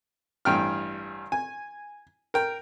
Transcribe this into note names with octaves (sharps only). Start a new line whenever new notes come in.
A1 G2 G5 F6
G#5
A#4 G5